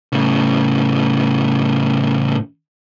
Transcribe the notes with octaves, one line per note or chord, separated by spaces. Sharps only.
A2 C#3